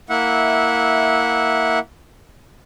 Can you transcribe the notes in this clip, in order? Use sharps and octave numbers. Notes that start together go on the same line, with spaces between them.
A#3 E4 E5 F#5